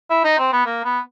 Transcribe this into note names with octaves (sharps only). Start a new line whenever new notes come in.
E4
D#4
C4
B3
A#3
B3